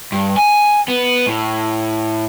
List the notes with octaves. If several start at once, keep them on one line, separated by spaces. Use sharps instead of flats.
G2
G#5
B3
A2